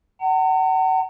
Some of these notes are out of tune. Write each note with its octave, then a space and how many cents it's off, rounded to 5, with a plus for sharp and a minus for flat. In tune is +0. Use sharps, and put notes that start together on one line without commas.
F#5 +35 A#5 -45